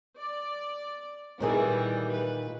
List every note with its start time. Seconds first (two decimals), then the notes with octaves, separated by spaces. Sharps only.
0.18 D5
1.40 A#2 D#3 E3 G3 G#4
2.10 B4